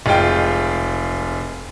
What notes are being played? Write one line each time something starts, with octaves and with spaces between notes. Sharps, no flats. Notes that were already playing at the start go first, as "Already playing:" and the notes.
F1 G#3 F4 G5